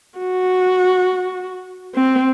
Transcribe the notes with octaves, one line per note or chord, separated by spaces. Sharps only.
F#4
C4